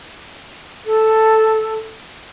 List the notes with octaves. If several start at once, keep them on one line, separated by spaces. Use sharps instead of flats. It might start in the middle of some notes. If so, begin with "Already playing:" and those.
A4